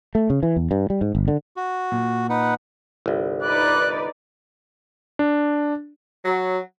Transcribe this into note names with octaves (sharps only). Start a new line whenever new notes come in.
A3
C#3
E3
E2
G2
G3
G#2
G1
D3
F#4
A#2
D#4 B4 F#5
G1 C2
D#4 B4 D5 F#6
D4
F#3